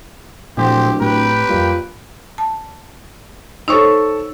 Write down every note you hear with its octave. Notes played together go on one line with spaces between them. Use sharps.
D1 A#2 F3 A3 C4 G4
A2 A3 C4 G4 B4 G5
F2 A#2 G3
A5
D#4 A4 C5 C#5 C#6 E6